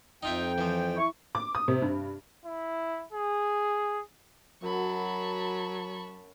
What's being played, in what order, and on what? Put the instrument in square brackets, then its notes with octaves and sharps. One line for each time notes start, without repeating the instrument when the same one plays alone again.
[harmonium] F2 G5 [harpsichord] D#4 F4 E5
[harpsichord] E3 F3
[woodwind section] E4 C#6
[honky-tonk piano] D6
D#6
C3
G2
[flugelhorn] E4
G#4
[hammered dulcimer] F#2 [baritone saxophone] F#3 [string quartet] A5 B5 C#6